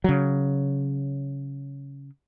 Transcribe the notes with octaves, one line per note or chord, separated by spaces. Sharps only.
C#3 F#3